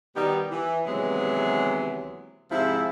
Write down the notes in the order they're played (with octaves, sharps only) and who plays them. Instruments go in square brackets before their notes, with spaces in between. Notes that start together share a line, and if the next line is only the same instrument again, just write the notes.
[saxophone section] B2 D#3 G3 B3 D#4 G4
E3
D#2 C3 E3 F#3 G#3 B3
G#2 C3 F3 E4